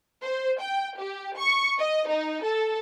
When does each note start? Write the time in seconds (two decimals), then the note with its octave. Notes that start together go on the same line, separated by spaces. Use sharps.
0.24 C5
0.60 G5
1.00 G4
1.38 C#6
1.79 D#5
2.09 D#4
2.43 A4